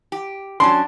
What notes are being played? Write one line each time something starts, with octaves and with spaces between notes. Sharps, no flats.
G4
F#3 C#4 D4 C6